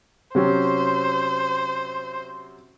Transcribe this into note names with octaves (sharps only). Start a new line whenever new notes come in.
C3 F#3 C#4 C5